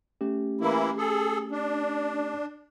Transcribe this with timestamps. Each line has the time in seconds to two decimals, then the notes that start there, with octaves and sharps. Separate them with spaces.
0.21 A3 C#4 G4
0.61 E3 A#3 E4
0.98 G#4 A4
1.52 D4